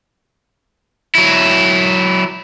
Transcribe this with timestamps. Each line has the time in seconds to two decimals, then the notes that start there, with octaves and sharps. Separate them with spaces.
1.15 F#3 E4